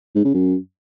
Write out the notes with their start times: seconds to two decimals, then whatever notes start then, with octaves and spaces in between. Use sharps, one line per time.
0.15 G#2
0.25 C#3
0.34 F#2